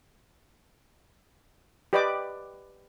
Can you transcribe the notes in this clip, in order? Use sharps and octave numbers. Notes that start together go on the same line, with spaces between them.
G4 B4 D5 D#5 G5 D6